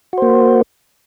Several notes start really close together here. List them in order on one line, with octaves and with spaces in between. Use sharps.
F#4 C5 A#3